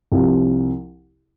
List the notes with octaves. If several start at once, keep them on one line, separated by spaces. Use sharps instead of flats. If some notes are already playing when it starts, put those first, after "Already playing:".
C2 C3 F3